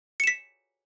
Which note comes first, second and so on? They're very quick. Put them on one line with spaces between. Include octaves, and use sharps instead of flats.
C#7 E7 B6